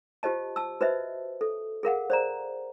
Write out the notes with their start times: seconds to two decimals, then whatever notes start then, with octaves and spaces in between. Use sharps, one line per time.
0.23 F4 G4 C5 D#5 A5
0.56 A5 E6
0.81 F#4 B4 C5 D#5 E5
1.41 A4
1.83 G#4 A#4 F5 F#5
2.10 C5 D5 A#5